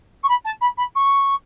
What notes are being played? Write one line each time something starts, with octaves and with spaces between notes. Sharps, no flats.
C#6
B5
A5
B5
B5
C#6